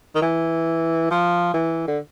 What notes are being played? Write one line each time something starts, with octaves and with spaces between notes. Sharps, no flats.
D#3
E3
F3
E3
D3